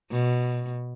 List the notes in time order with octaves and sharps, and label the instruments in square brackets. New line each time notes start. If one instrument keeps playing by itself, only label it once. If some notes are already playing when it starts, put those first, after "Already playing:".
[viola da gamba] B2